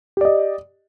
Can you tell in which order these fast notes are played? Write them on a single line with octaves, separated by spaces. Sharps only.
G4 D5 D#5